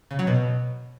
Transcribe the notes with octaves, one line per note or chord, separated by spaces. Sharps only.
C#3
F#3
B2